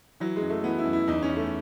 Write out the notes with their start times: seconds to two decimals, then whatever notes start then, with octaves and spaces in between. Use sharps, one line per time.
0.20 E3 F#3
0.36 G#3
0.42 F#2
0.50 A3
0.64 E3 B3
0.78 E4
0.85 F#2
0.93 E4
1.08 E2 D#4
1.22 C#4
1.30 E2
1.36 A3